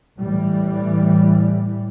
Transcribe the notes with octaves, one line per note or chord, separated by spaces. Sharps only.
A2 E3 G3